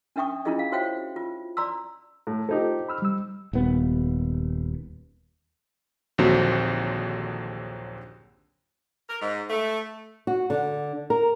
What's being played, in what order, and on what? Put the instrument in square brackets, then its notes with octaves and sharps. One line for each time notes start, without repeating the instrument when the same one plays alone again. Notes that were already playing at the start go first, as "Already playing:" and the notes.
[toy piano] C#4 D4 E5 G5 C#6 D#6
C#4 D4 E4 F4 G#4 D#5
F5
F#4 C5 C#5 E5 F5 G5
F4
D5 A#5 C6 E6
[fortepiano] A2
[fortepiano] C4 D#4 G4 [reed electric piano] F4 A4
[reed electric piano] B5 E6 F6
G3 E6
[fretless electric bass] D#1 D#2 B3
[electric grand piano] A#1 D#2 D3 F#3 C4 F#4
[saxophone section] A#4
G#2
A3
[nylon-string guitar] F#4
D3
A#4